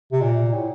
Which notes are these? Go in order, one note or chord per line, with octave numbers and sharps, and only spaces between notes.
C3
A#2
A2